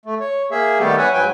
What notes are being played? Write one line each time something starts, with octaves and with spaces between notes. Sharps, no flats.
A3
C#5
A#3 G#4 E5
D#3 G3 A3 B3 G4 A4
B4 C#5 E5 F#5 G#5
G#2 F#3 B4 G5 G#5